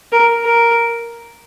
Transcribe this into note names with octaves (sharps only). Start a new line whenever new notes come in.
A#4
A#4